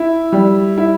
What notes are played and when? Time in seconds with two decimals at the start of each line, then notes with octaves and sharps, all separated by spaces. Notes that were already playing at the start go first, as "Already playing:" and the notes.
Already playing: E4
0.32 G3
0.78 E4